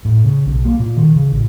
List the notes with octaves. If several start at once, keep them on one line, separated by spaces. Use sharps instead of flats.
A2
C#3
B1
A#3
A#2
D#3
C#3
A1